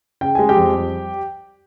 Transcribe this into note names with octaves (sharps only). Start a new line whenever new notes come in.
C#3 G5
G#3 G#5
G4 G5
F2
G3